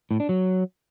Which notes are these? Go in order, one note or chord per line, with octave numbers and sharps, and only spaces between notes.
A2
D4
F#3